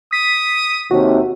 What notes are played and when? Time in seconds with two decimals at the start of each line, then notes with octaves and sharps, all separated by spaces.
0.12 D#6 B6
0.91 D#2 C3 F#4